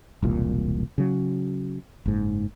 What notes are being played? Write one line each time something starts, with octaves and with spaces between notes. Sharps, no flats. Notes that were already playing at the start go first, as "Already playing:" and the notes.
E1 C2 A#2
C#3 F#3
F#1 G#2